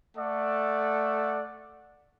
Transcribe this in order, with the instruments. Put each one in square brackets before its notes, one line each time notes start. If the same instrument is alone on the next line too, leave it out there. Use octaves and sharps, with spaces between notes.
[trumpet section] A3 A4 D5 F#5